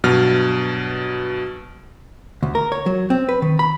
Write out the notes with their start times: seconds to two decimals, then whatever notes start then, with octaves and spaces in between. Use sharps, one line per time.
0.04 G2 B2 F#3 F6
2.43 D2
2.55 A#4
2.72 C#5
2.86 F#3
3.10 C4
3.29 B4
3.42 D#3
3.59 B5